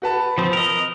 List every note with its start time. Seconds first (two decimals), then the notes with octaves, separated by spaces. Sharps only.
0.02 F#4 B4 A5
0.38 F3 C4
0.53 A#4 D#5